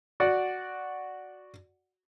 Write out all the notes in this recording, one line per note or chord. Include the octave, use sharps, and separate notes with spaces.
F#4 D5 F#5